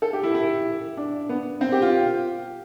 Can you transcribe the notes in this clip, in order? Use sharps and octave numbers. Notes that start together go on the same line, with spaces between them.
A4
G4
E4
E4
D4
B3
C4
G4
F4